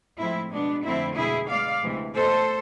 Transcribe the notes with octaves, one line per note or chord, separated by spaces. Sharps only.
A2 F3 G#3 C4 E4
B2 G#3 B3 D4
F2 D3 A3 C4 E4
B2 G#3 E4 G#4
B2 G#3 D5 F5
D2 C3 E3 G#3
B2 A3 A4 C5